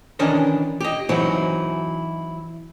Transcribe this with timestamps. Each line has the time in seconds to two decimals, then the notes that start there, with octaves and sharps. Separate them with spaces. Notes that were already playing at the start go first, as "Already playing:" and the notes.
0.19 D#3 E3 C#4 D4 A#4 D#5
0.81 G4 D#5
1.09 E3 F#3 C4 D#4 E4 F#4